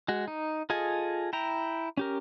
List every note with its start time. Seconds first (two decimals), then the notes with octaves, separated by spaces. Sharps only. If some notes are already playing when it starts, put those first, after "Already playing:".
0.08 G#3 F#4
0.28 D#4
0.70 F4 G#4 A4 D#5 G#5
1.33 E4 G5 A#5
1.97 C#4 G4 A#4